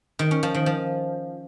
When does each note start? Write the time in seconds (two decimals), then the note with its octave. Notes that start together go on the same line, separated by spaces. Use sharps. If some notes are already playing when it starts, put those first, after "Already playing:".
0.19 D#3
0.31 C#4
0.43 F3
0.55 D#3
0.66 F3